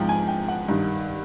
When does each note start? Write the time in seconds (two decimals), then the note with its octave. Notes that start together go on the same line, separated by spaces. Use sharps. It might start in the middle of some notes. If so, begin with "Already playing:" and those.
Already playing: G#2 F3 G5
0.09 G#5
0.28 G5
0.48 F#5
0.68 G2 D#3